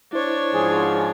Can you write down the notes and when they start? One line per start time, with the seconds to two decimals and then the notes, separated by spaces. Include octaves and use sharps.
0.13 D4 E4 C5 C#5
0.54 G#2 F3 G#4